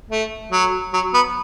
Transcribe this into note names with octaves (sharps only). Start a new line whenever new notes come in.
A3
F#3
F#3
B3